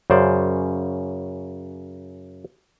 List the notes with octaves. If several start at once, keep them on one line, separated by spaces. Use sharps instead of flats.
F#2 C#3 C5 D5